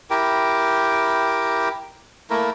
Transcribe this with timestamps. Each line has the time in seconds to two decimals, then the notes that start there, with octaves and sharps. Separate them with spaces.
0.10 E4 G4 A#4 G5
2.30 A3 A#3 E4 A#4